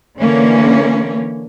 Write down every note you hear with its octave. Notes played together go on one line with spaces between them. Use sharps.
D3 E3 A#3 C#4